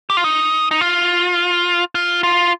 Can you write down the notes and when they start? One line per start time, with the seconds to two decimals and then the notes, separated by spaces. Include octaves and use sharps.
0.10 G4
0.17 F4
0.24 D#4
0.71 D#4
0.81 F4
1.95 F4
2.23 F4